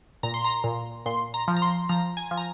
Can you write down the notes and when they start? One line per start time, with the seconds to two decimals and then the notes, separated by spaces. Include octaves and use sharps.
0.23 A#2 A#5
0.34 C6
0.44 A#5
0.64 A#2
1.06 A#2 C6
1.34 A#5
1.48 F3
1.57 A#5
1.62 C6
1.89 F3 A#5
2.17 G#5
2.31 F3
2.37 A#5